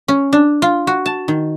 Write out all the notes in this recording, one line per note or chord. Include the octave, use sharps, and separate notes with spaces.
C#4
D4
F4
F#4
A5
D#3